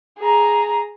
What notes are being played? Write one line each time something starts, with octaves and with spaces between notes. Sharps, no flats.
G#4 A#5